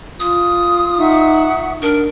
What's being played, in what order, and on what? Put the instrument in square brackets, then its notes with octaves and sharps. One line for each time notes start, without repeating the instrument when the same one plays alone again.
[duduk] F4 [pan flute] D#6
[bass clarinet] D#4 [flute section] E5 F#5 C#6
[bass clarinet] D4 [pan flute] A#4